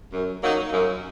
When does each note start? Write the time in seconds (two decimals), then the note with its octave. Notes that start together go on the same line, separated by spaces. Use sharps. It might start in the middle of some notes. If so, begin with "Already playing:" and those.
0.12 F#2
0.41 F#3 A#3 D#4
0.71 F#2